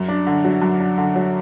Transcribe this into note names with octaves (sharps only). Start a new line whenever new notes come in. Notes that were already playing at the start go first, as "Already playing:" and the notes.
Already playing: F#2
D4
D3
F#3
F#2
D4
D3
F#3